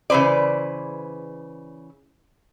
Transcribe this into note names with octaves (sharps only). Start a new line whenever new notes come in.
C#3 E3 B4 C5 D5